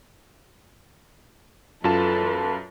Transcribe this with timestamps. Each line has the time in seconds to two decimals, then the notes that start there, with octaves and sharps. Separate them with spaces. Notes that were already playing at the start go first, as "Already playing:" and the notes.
1.84 F#2 F4 A4 B4 A5